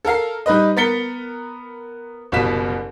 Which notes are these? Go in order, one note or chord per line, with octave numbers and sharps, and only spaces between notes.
A4 A#4 F5 C7
G3 D#4 B4 D#5
B3 A#4 A6 B6 C#7 G7
F#1 C2 B2 F5 B6 E7